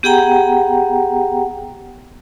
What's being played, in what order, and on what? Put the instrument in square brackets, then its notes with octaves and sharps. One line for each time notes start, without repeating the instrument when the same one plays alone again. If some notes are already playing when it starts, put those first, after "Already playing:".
[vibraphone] B3 G4 G#4 F#5 G5 A#5